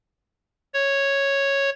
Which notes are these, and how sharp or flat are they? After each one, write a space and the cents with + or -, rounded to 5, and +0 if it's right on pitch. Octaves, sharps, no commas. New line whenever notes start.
C#5 -5